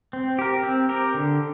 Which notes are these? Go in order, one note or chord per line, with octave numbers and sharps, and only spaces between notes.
C4
G4 A#4
C4
G4 A#4
D3